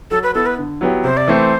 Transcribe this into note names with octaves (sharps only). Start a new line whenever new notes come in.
F#3 A4
B4
B3 E4 A4
B4
D3
F#3 B3 E4 G4
C3 C5
D5
E3 A3 C4 C5